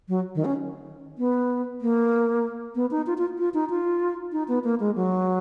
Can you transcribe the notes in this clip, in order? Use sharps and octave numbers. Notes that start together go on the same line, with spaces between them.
F#3
D#3
C#4
B3
A#3
B3
D#4
F4
F4
F4
D#4
F4
D#4
B3
A#3
G#3
F#3